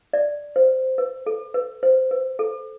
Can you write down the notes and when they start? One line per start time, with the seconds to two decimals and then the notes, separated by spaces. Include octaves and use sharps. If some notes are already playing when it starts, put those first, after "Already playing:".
0.13 D5
0.56 C5
0.98 B4
1.26 A4
1.54 B4
1.83 C5
2.11 B4
2.39 A4